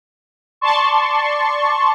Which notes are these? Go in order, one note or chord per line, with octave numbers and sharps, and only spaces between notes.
D5 A5 C6 C#6